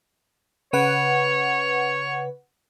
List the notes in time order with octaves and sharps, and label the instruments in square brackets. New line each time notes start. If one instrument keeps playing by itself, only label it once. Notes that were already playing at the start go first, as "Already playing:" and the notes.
[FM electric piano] C#3 B4 F#5 [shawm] C#5